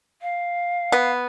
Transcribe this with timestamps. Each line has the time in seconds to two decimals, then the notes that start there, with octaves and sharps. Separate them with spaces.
0.22 F5
0.92 B3